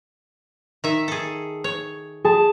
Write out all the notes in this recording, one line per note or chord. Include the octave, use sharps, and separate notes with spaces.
D#3 E5
G#4 A4
C#5
G#4 A5